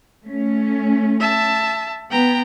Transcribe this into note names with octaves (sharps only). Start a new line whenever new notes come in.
A3 C#4
E5 A5
B3 G5 A#5